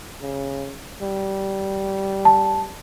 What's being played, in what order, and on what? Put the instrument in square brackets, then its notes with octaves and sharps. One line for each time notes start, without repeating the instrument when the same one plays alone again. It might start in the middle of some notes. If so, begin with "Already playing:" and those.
[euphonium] C#3
G3
[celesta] A5